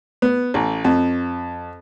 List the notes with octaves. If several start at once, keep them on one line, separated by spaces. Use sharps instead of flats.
B3
A1
F2